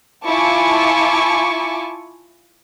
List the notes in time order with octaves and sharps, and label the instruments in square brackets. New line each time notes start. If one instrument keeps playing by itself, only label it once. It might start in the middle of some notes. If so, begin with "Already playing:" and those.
[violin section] E4 F4 G#5 A5 C#6 D6